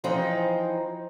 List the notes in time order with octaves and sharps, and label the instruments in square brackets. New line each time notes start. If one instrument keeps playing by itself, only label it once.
[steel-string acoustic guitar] E3 F3 C4 D#4